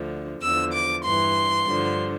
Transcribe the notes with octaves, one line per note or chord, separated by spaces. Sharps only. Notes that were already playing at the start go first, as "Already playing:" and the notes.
Already playing: D2 D3 F3
E2 D3 F3 E6
D6
G2 E3 C6
G2 D3 F3